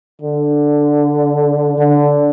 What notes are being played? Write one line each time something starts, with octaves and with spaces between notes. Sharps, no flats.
D3
D3